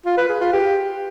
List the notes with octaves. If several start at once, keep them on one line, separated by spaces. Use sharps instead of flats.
F4
B4
G#4
F4
G4